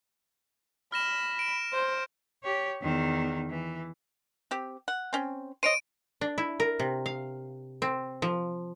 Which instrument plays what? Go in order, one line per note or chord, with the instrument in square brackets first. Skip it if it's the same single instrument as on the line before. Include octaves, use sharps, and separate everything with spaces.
[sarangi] B5 [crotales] F6 A#6 E7
[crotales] D7 E7
[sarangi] C5
[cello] G4 C#5
E2 D#3
E3
[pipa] C4 G4
F#5
C4 C#4
[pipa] C5 C#5 D#5 [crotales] D7 D#7
[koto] D4
E4
A#4
C3
F5
C4
F3